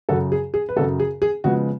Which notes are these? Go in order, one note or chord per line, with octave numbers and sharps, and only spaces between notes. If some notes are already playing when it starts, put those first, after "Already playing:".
F#2 C#3 F#3 F#4 A4
G#4
G#4
B4
F#2 C#3 F#3 F#4 A4
G#4
G#4
C#3 F3 G#3 B3 F#4